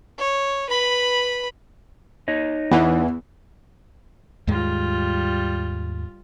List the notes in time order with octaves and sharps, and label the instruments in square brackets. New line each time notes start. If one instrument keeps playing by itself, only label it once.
[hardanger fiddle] C#5
B4 B5
[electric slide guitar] D#4 C#5 D#5
[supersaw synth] E2 E3 [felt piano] B3
[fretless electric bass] D#2 G#2 G#3 [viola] G3 F4